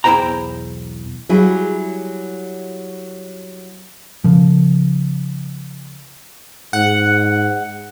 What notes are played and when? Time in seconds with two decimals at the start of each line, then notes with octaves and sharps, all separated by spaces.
0.04 B1 E2 E4 C5 G5 A#5
1.29 F#3 G3 E4 G#4
4.24 C#3 F3
6.73 G#2 F#5